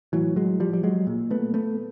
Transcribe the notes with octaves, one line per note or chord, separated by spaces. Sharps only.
A2 E3 F#3
F#3 G#3
F3 G3
G3
F#3 G#3
A#2
A3 B3
A3 B3